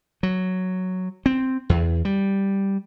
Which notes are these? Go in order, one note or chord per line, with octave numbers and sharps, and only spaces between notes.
F#3
C4
E2
G3